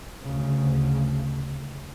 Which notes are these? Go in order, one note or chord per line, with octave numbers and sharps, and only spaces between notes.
D2 C#3